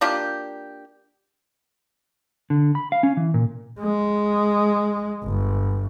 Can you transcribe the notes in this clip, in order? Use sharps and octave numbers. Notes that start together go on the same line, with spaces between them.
A#3 D4 F4 G4
D3
B5
F5
C#4
E3
A#2
G#3
G1